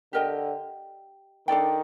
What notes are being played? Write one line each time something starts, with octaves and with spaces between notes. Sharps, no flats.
D3 G4 A#4 D#5 G5
D#3 D4 A4 D5 G5